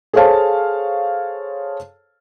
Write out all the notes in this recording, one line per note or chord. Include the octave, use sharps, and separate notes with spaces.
G#4 A4 C5 C#5 F5 A5